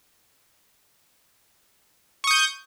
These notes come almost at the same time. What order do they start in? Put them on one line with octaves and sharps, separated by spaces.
C#6 D#6 G6